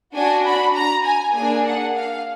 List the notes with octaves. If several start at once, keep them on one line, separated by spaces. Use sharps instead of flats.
D4 F#4 G#5
B5
A#5
G#5
A#3 D4 G#4 G#5
F#5
F5